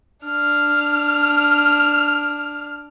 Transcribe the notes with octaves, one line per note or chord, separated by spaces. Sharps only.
D4 F6